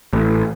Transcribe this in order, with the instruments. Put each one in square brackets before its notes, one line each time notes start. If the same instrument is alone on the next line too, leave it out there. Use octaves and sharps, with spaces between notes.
[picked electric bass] A1